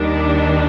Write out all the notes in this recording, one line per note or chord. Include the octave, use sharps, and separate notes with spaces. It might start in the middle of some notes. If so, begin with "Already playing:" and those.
Already playing: D#2 D#3 G3 D4